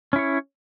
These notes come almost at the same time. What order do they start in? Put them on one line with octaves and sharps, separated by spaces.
C#4 E4 C#5